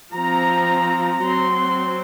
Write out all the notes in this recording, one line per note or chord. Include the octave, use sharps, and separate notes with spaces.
F3 C4 A#5
F#3 C4 C6